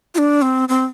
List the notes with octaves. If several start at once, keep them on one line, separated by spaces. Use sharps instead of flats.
F4
D4
C4
C4